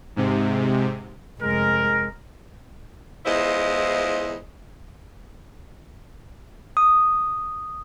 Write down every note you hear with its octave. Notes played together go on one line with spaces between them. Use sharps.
G#2 C3
F1 G#3 A#4
E2 G#3 E4 F4 C5 D#5
D#6